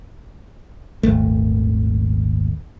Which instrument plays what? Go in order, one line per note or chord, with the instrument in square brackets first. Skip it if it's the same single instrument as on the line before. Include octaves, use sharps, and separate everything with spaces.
[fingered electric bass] D#1 G#1 A3